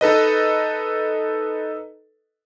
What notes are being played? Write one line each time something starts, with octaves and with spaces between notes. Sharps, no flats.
D#4 A4 B4 D#5